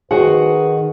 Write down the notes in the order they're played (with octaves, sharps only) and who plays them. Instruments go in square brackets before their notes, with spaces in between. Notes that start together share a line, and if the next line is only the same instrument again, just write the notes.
[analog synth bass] D#3 [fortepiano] F#4 C5 F#5 [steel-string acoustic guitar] G#4 [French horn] B4